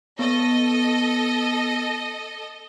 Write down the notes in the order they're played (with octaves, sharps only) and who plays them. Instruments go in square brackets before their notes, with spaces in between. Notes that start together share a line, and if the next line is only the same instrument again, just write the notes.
[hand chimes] B3 [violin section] A4 D#5